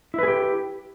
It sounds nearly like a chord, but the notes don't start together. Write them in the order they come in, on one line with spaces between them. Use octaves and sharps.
E4 B4 G#4 G4